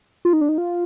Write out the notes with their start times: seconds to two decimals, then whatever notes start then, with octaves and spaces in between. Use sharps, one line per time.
0.25 F4
0.33 D#4
0.41 D4
0.49 D#4
0.58 F4